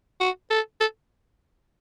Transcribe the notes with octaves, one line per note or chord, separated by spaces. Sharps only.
F#4
A4
A4